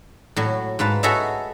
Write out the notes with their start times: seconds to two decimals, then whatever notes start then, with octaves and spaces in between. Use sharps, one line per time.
0.36 A2 F#3
0.79 G#2 B4 F5 A5
1.03 F#4 G#4 A4 C#5 D#5 E5